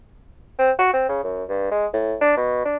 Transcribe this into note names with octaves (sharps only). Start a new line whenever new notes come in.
C4
F#4
C4
C#3
F#2
G2
G#3
A2
D4
B2
D4